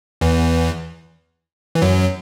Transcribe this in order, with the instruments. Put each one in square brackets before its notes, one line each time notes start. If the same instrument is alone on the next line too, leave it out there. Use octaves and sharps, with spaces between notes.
[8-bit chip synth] E2 E3
E3
F#2 F#3